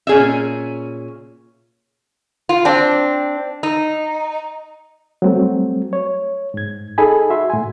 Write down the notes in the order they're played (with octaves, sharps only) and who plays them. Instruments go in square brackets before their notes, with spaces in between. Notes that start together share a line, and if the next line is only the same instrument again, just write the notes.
[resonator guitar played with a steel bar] A#2 C#4 G#4 D#5 E5
F4
C4 D4
D#4
[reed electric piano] F#3 G3 A3 C4
C#5
G#2 G#6
D#4 G#4 A4 G#5 B5
F#4 E5 C6
A2 G#5